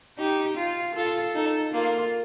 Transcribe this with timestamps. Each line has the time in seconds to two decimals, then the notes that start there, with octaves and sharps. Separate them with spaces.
0.18 D#4 G4
0.57 F4
0.96 F4 A4
1.35 D#4 A4
1.74 A#3 F4